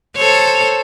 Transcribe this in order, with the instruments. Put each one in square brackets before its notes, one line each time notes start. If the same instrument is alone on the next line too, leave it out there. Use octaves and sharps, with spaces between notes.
[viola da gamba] A4 C5 C#5